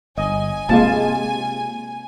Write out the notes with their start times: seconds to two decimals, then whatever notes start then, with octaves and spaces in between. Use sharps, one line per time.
0.18 G1 D#5 G#5
0.69 C3 G#3 A#3 F4 A5